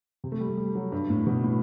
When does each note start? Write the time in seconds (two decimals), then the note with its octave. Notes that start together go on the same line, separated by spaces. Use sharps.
0.24 C3
0.32 A3
0.40 G3
0.49 A3
0.57 G3
0.75 F#3
0.92 G2
1.10 A2
1.27 B2
1.44 A2